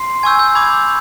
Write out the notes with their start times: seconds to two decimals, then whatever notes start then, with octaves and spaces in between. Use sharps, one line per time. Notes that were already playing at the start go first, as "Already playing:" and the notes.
Already playing: C6 C7
0.23 G#5 C#6 E6 G6 G#6
0.39 G6
0.55 B5 D6 G6 G#6